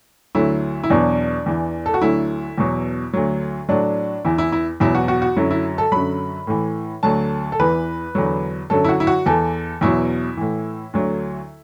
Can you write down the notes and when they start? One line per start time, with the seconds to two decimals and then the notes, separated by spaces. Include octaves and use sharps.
0.35 D2 D3 F#3 E4
0.84 E4
0.90 E2 B2 F#3 D4
1.46 E2 E3
1.86 A4
1.94 F#4
2.02 D2 D3 F#3 E4
2.58 E2 B2 F#3
3.13 D2 D3 F#3
3.69 A2 F#3 D4
4.24 E2 E3 E4
4.38 E4
4.52 E4
4.80 E2 B2 F#3 E4
4.95 F#4
5.08 F#4
5.22 F#4
5.36 F#2 D3 F#3 E4
5.51 E4
5.78 A4
5.92 F#2 D3 F#3 B5
6.47 A2 E3
7.03 D2 D3 F#3 A5
7.52 A4
7.60 E2 E3 B4
8.15 E2 D3 F#3
8.70 F#2 D3 F#3 A4
8.85 E4
8.89 F#4
9.00 E4
9.07 F#4
9.26 E2 E3 A4
9.81 E2 B2 F#3 E4
10.37 A2 E3
10.93 D2 D3 F#3